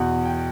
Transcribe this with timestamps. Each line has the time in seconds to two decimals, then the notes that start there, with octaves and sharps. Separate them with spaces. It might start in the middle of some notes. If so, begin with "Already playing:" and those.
Already playing: E2 B2 F#5
0.25 G5